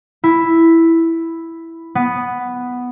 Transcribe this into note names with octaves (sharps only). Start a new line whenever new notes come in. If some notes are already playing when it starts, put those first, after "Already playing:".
E4
B3